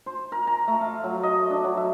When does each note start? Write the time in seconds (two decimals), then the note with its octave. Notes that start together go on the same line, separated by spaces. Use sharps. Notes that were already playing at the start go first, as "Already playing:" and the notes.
0.06 C5
0.32 A#4
0.47 A#5
0.68 A3
0.81 F5
1.04 F#3
1.23 D#5
1.50 D4
1.64 F#3
1.77 E5